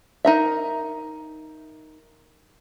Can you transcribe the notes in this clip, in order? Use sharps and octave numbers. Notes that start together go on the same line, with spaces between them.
D#4 A#4 E5